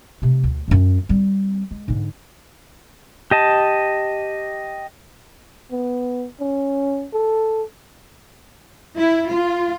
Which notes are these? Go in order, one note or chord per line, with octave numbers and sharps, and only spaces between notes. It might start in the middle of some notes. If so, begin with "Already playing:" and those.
C3 A3
D2
D1 F#2
G3 C4
G#3
G#2 D3
G4 D#5 A5
B3
C#4
A4
E4
F4